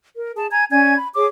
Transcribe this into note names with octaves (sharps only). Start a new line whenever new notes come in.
A#4
G#4 A5
G#5 A#5 G#6
C#4 D5 G#5 G#6
B5
G#4 C#5 D6